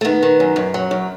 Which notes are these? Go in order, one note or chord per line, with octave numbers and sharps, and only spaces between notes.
A3
D#3 B3
D#3
F#2
F#2
F#3
F#2